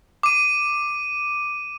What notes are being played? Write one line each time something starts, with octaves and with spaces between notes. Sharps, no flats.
D6 D#7